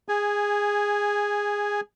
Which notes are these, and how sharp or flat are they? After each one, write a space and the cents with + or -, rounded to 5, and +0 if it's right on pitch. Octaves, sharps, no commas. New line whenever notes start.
G#4 -15 G#5 +0